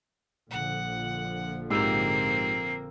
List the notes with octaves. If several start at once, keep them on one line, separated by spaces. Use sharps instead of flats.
A#1 D3 F3 F#5
G#2 A#3 C4 G4 E6 C7